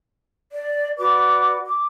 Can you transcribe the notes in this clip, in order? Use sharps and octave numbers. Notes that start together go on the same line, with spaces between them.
D5
F#4 B4 D5 D6
D6